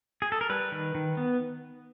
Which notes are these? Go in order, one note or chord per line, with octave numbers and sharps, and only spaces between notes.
G#4
A4
A#4
G3 B4
D#3
D#3
B3